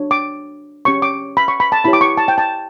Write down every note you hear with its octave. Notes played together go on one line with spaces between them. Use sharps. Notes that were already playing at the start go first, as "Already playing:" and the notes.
Already playing: D4 F#4 C#5
D6
C#4 G4 C#5 C#6
D6
B5
C#6
B5
A5
E4 G4 C#5 B5
D6
C#6
A5
G5
A5